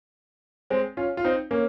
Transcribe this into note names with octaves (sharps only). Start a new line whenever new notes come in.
G#3 C4
C#4 F4
F4
C4 D#4
A#3 C#4